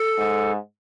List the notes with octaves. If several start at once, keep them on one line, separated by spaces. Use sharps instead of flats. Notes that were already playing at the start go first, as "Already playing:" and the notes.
Already playing: A4
G#2